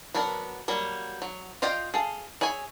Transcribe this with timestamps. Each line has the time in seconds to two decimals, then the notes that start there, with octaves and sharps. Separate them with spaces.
0.15 F#3 B3 D4 A#4
0.68 F#3 G3 A#3
1.22 F#3
1.62 F4 D5 D#5 F5 G5
1.94 G#4 A4 F5
2.41 G#4 C#5 E5 G#5